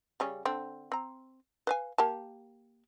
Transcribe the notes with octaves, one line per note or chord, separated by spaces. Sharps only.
C#3 G3 C#4
D3 C4
C4 A#5
B4 F5 G#5
A#3 G4 A5